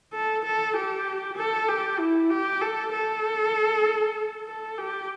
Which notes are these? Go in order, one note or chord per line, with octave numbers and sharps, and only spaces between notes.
A4
A4
G4
A4
G4
E4
G4
A4
A4
A4
G4